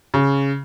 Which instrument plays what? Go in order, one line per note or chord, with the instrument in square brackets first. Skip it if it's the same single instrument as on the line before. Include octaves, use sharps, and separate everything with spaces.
[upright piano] C#3